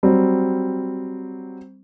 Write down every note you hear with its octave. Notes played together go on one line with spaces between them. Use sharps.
F#3 G3 C4